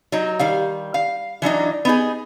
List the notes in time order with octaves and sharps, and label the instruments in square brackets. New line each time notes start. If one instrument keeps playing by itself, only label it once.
[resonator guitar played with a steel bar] F#3 D#4
D#3 G3 F5
F5
E3 F#3 D4 D#4
B3 D#4 G#4